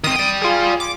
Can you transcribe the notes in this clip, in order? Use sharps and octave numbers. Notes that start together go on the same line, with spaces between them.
D#3 C4 D#6
D5 G5
F4 G#4
D6